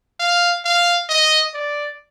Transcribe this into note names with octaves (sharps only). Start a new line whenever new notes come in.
F5
F5
D#5
D5